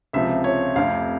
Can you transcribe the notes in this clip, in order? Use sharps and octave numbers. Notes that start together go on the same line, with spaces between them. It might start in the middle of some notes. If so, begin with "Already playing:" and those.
C#2 C3 F3 E5
C#5
F1 F2 C3 F5